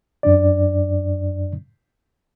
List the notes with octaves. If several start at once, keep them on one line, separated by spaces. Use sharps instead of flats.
F#2 D4 D5